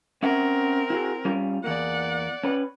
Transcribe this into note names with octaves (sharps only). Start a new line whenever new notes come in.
C4 C#4 A#4 E5 F#5
E4 F#4 G#4
G3 C#4 F4
E2 A#3 D5 F#5
C#4 B4